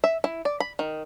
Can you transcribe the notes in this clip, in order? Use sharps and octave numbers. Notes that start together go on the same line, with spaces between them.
E5
E4
D5
B5
D#3